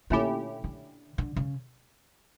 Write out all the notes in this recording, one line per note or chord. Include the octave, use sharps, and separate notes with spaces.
A#2 D3 A3 C#4 E4 G4
D3
D3
C#3